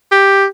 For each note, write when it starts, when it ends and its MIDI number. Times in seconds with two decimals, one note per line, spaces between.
0.11 0.45 67